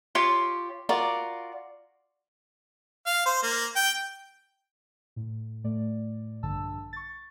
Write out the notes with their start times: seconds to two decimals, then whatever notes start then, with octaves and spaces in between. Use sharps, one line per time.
0.15 F4 G4 C#5 C6
0.89 F4 F#4 A#4 D5
3.07 F5
3.26 C5
3.43 A#3
3.76 G5
5.16 A2
5.64 A2 A3 D5
6.43 A#1 G2 D3 A5 E6
6.93 C#6 A6